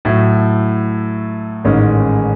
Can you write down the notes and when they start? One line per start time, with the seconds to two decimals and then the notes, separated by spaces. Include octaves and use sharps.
0.05 A2 F#3 A3
1.64 A1 G#2 D#3 G#3 C#4